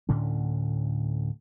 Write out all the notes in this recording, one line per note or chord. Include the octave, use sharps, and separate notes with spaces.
D2 A2 D3 C#4